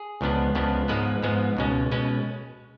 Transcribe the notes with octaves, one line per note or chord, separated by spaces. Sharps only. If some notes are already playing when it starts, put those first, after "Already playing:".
Already playing: G#4
C#2 C#3 F3 B3 D4
C#2 C#3 F3 B3 D4
G#2 F3 G#3 B3 B4
G#2 F3 G#3 B3
C#2 B2 G#3 C#4
B2 G#3 C#4 B4